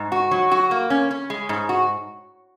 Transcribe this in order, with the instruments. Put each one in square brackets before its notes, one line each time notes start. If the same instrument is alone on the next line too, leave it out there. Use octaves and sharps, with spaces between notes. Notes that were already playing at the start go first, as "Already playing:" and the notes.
Already playing: [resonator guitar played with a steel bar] G#2
F#4
F#3
F#4
A#3
C#4
C#4
G#3
G#2
F#4